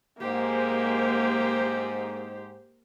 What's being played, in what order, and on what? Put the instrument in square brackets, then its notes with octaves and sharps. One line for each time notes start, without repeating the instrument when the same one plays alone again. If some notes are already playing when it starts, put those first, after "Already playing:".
[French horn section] G#2 [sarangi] A#3 [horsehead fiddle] G4 C5